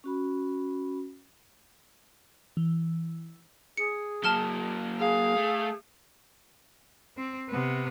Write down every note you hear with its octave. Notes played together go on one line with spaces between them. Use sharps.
C#4 F#4 B5
E3
G#4 C#7
F#3 A#3 A5 F6 G7
G#4 F5
A3
C4
C3 B3